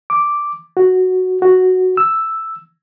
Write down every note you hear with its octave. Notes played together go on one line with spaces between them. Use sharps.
D6
F#4
F#4
E6